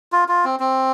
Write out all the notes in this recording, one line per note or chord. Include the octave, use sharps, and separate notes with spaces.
F4
F4
C4
C4